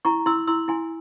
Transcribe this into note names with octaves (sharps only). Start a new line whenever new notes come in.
E4 A#5 C#6
E4 C6 E6
E4 C6 E6
E4 G#5 C6